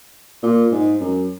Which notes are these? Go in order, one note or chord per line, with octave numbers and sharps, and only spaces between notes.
A#2
G#2
F#2